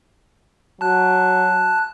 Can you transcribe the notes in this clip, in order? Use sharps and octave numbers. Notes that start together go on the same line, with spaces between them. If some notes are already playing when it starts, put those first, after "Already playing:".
F#3 A5 F#6